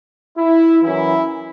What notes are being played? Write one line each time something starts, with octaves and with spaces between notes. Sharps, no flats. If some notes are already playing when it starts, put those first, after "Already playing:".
E4
F#2 E3 E4